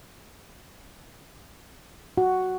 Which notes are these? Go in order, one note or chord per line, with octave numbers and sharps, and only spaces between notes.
F#4